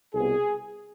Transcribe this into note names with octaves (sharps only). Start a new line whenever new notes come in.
C2 B2 B3 G#4